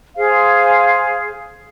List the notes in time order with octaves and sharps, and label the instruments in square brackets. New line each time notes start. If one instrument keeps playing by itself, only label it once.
[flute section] G#4 C5 F5